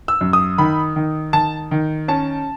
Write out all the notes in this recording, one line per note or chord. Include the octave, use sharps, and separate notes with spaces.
E6
F#2
D#6
D#3 B5
D#3
D#3 A5
D#3
C#4 A5